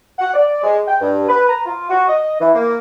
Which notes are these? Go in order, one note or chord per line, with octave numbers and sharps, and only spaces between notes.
F#5
D5
G#3
G5
G2
B4
A#5
F4
F#4
D#5
E3
A#3